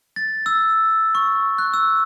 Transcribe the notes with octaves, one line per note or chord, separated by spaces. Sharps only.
A6
E6
C#6
F#6
E6